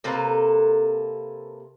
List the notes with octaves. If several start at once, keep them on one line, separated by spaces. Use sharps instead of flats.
C3 A#3 A4 B4